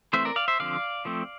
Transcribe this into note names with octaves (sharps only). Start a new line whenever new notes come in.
E3 A3 C4 C5 E5
A#4 D5
D5 F5
C5 E5
D3 F3 C4 D5 F5
F3 A3 C4